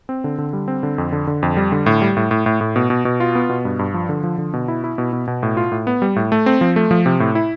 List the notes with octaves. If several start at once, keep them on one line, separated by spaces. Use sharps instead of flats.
C4
D3
D3
G3
C4
D3
F2
D3
D3
F2
G3
D3
A2
G3
A2
A2
A2
A2
B2
B2
B2
F4
B3
B2
G2
G2
F3
D3
F3
D3
B2
E4
E4
B2
B2
B2
A2
F4
A2
B3
G3
A2
A3
C4
F3
A3
F3
C3
A2
E4